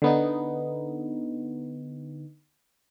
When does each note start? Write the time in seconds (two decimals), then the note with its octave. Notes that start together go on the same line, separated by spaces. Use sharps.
0.02 D3 B3 D#4